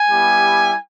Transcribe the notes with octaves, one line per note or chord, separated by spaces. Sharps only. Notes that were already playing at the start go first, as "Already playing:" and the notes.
Already playing: G#5
G3 B3 E4 G4